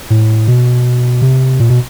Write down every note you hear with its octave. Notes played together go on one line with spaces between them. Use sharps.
A2
B2
C3
A#2
B2